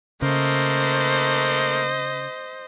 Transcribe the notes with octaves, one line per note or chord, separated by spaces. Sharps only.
C#3 A3 A#3 C5 D#5